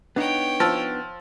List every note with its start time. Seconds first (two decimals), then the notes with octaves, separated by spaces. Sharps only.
0.16 B3 D4 D#4 C#5 G5
0.60 F3 E6